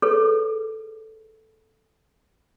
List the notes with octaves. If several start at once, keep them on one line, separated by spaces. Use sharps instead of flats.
G#4 A4 B4 C#5